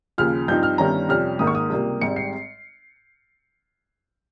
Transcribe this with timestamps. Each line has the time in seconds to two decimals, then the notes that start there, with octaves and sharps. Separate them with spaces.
0.18 D#2 C#3 F3 F6
0.48 G2 F3 C4 D#4 G6
0.63 F6
0.78 G1 G2 D#3 G3 C#4 A#5
1.09 F2 C3 G3 C#4 F6
1.39 G#1 G#2 D#3 A#3 D#6
1.47 C#6
1.55 D#6
1.70 C#2 C3 G3 A#3
2.01 G#1 G#2 G3 C4 C#7
2.16 C7